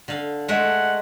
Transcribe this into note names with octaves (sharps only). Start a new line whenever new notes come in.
D3 F5
G#3 A3 F#5